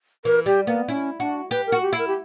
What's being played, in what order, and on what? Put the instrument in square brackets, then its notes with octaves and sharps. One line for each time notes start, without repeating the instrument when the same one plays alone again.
[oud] E3 [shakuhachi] A#4
[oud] G3 [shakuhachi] G4
[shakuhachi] A#3 [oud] B3
[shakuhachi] C#4 [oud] E4
[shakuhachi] D4 [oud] F#4
[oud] G4 [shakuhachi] B4
[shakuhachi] A#4
[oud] F#4
[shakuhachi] G4
[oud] E4
[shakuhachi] A#4
G4